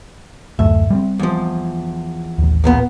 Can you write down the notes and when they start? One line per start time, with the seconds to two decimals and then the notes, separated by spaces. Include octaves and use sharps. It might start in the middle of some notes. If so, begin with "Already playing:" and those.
0.59 D1 F#2 A3 E5
0.90 G3 G#3 C4
1.19 E2 F3
2.38 A1 D#2
2.64 E2 A#2 B3